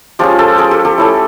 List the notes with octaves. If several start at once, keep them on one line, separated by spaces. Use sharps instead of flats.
F3 G#3 C#4 F4 G4
G4 A4
G#4 A#4
G4 A4
G4 A4
A3 C#4 E4